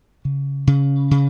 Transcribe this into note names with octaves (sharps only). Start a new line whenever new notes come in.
C#3
C#3
C#3